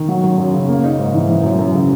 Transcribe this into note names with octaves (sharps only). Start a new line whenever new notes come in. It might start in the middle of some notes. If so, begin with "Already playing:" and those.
Already playing: D#3
F#3
F#2
F#2
C#3
A#3
D#4
G#2
E3
E3
F#2
F#2
C#3